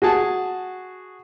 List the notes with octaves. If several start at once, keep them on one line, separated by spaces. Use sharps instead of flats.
F#4 G#4 G#5 A5